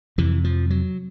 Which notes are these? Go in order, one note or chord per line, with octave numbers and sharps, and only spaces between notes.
F2 C3 E3
F3
F#3